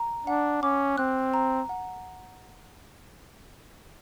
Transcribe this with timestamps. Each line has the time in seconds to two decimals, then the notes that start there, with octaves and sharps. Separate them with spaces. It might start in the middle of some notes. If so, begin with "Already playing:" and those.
Already playing: A#5
0.27 D4 F#5
0.62 C#4 D6
0.98 C4 F#6
1.34 A#5
1.69 F#5